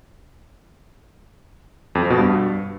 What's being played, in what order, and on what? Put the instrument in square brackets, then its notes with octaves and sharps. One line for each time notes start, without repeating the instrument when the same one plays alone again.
[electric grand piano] F2
F3
B2
G2